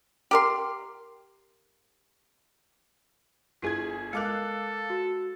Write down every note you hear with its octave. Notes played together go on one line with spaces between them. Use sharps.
G4 A#4 C6
G1 E4 F4 G#4 G#6
G#3 A4 A#4 F5 D6 F#6
F#4